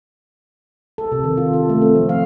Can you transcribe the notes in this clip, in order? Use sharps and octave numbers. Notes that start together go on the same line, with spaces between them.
A4
C3
D#3
F4
A4
A3
C4
F3
F5